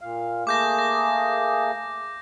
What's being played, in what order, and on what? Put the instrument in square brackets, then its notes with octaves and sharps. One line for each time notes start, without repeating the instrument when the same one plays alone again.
[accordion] A#2 F5
[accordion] A3 A#3 G#4 [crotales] D6 G6 A#6
[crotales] A#6